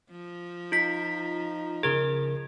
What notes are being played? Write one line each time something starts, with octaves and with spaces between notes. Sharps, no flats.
F3
D#4 F4 B6
C#3 G#4 A#4 G#6